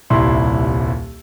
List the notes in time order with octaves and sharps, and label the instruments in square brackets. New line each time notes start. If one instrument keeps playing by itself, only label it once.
[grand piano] D#1 C2 E4 C6